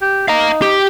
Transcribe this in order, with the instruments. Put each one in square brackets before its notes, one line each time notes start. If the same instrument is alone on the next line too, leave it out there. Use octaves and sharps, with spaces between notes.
[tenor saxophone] G4
[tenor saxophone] D#4 [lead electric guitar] F5 A#5
[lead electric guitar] G4